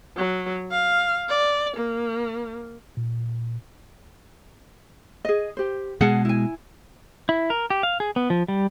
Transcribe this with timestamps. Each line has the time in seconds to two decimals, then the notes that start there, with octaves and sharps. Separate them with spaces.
0.17 F#3
0.71 F5
1.29 D5
1.77 A#3
2.97 A#2
5.25 G#4 D#5
5.57 G4 C5
6.01 B2 G#3 G#4 F#5 A5
6.25 E4 G#5
7.29 E4
7.50 A#4
7.70 G4
7.83 F5
8.00 G#4
8.16 B3
8.30 F3
8.48 G3